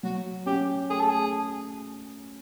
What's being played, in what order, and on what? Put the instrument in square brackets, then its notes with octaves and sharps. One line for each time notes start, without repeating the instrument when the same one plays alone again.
[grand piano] F#3 [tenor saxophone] F#4
[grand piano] C#4 [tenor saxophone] G4
[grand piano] A3 [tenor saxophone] G#4
[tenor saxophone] A4
G#4